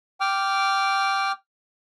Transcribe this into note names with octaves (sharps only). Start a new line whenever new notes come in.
G5 D6 F6